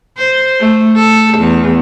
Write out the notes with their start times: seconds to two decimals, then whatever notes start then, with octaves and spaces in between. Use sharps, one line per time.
0.17 C5
0.60 A3
0.96 A4
1.38 E2